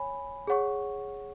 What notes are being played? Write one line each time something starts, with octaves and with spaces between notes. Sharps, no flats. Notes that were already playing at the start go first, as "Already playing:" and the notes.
Already playing: C#5 G#5 B5
G#4 C#5 F#5 C#6